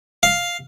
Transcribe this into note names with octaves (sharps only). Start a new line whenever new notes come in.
F5